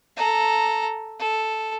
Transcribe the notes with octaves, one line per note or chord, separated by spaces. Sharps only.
A4 A#5
A4